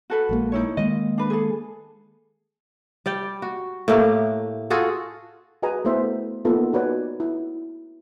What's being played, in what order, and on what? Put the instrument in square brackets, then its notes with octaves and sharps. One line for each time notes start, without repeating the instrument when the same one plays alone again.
[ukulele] F#4 A4 B4
[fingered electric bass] A#1 G#3 A#3
[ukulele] D#4 E4 C#5
[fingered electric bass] D#3 G#3 A#3 [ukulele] D#5
[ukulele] D4 B4
G#4 A4
[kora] G3 D5 G5
F#4
A2 A3 A#3 G4
F4 F#4 G#4 A4
[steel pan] F#4 G#4 B4 D#5 G#5 A#5
A3 B3 E4 B4 C5 E5
A#3 B3 D#4 F4 A4
D#4 F#4 B4 C#5 D5
E4